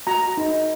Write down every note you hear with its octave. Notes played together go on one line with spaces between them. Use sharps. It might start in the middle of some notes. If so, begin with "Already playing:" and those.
F#4 A#5
D#4